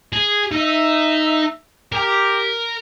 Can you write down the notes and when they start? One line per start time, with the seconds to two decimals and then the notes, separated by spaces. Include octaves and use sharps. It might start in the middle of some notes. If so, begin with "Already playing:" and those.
0.13 G#4
0.52 D#4 E5
1.92 G4 A#4